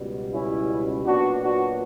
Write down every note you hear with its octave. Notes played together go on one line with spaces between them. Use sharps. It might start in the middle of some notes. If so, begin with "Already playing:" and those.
Already playing: C#2 B2 G3
C#4 E4
A#2 F#3 B3 D4 F#4
D4 F#4